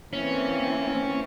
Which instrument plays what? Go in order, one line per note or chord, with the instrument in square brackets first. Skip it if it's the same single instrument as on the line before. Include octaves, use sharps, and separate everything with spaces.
[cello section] E3 A#3 C4 [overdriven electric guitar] C#4